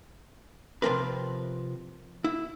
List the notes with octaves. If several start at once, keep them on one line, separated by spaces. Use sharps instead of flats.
C3 E3 F3 C4 A#4 B4
E4